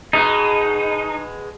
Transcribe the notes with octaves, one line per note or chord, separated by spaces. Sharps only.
B2 G#3 D#4